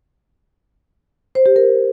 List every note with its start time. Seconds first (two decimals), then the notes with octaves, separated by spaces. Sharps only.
1.35 C5
1.46 G4
1.56 A#4